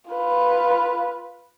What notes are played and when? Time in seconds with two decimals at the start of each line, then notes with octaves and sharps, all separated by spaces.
0.11 F4 B4